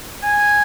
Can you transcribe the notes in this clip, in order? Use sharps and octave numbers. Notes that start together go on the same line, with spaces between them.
G#5